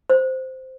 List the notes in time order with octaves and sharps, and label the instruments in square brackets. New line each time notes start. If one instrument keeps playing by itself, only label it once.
[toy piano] C5